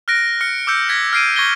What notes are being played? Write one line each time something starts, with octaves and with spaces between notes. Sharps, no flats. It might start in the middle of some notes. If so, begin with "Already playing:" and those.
F6 F#6 A#6 D7
F6 C#7
D6 E6 G6 C#7
G#6 A#6 B6
F6 G#6 C7 D7 D#7
C#6 G#6 A#6 G7